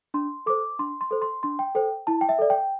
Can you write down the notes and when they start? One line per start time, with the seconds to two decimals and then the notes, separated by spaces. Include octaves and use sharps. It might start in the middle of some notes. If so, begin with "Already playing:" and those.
0.14 D4 C6
0.46 A4 C5 D6
0.79 D4 C6
1.01 C6
1.11 A4 C5
1.22 C6
1.43 D4 C6
1.59 G5
1.75 A4 C5 G5
2.07 E4 A5
2.21 G5
2.29 E5
2.39 A4 D5
2.50 G5